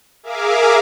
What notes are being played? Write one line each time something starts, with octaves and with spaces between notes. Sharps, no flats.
G#4 A#4 E5 F5 D6